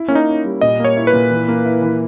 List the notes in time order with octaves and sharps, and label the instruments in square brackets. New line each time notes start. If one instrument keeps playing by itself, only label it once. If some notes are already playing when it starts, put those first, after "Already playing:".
Already playing: [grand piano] E4
[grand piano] A#3 [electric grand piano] C#4
[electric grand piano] D#4
[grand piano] C#4
G3
[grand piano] A#2 [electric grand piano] D#5
[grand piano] A#3 [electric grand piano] C#5
[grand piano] E4
[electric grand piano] B4
[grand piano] A#2
E3
A#3
E4
E3